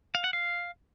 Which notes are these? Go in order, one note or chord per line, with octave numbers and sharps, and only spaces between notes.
F5
F#5
F5